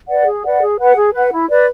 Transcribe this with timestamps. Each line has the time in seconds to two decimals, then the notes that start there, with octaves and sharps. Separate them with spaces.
0.08 B4 D5 F#5
0.26 G#4
0.45 B4 D5 F#5
0.62 G#4
0.79 B4 F#5
0.96 G#4
1.14 B4 F#5
1.31 E4
1.49 B4 D5